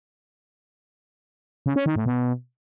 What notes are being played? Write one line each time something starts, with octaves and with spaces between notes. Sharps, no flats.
C#3
C#4
D#3
A2
B2